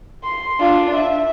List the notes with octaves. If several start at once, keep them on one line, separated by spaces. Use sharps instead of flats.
C6
D4 F4
E5